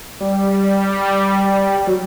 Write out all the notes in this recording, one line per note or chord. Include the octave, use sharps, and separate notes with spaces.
G3
F#3